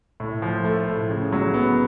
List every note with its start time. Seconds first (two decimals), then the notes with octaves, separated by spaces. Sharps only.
0.20 A2
0.42 F3
0.64 A3
0.87 A2
1.10 C#3
1.32 F#3
1.54 B3